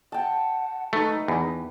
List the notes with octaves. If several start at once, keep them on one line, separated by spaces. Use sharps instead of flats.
F#5 G5 A5
A3 D#4 B4
E2